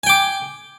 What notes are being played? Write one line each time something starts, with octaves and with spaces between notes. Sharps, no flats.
G5 G#5 D6